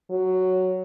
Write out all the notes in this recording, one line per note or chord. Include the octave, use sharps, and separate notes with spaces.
F#3